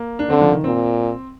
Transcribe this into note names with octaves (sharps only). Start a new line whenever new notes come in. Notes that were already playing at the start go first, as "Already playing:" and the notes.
Already playing: A#3
D4
D3 C4
F3
D#3
A#2 C4